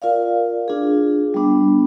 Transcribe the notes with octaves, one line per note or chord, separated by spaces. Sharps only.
F4 A#4 D5 F5
D4 F4 G#4
G3 B3 D4